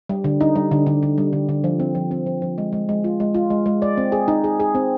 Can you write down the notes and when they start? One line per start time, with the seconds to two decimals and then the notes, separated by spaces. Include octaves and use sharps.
0.09 G3
0.24 D3
0.41 D#4
0.56 G3
0.71 D3
0.87 D3
1.03 D3
1.18 G3
1.33 D3
1.49 D3
1.64 F3
1.80 C4
1.95 F3
2.11 C4
2.26 F3
2.42 F3
2.58 G#3
2.73 G#3
2.89 G#3
3.04 F4
3.20 G#3
3.34 F4
3.50 G#3
3.66 G#3
3.82 D5
3.97 C4
4.12 G#4
4.28 D#4
4.44 G#4
4.60 G#4
4.75 C4